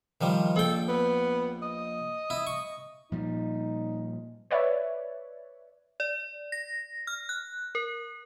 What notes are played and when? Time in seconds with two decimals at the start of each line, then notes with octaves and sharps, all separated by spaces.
0.21 D#3 F3 G3
0.56 A#1 A4 G5
0.89 B3
1.62 D#5
2.30 E4
2.47 C#6
3.12 A#2 F3 G3 D#4
4.51 B4 C#5 D5 E5
6.00 D5
6.52 A#6
7.07 F6
7.29 F#6
7.75 A#4